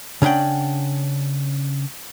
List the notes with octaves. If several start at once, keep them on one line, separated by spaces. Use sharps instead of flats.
C#3 C#4 D4 F#5 G5